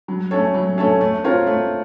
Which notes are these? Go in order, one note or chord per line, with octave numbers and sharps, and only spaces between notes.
F#3
A3 C#4 A4 C#5
F#3
A3 C#4 A4 C#5
A3
C4 F4 A#4 C#5
A3